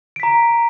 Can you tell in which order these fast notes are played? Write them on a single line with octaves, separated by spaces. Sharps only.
D7 B6 A#5